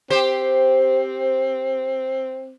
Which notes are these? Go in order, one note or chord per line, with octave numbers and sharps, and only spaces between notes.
C4 G4 C5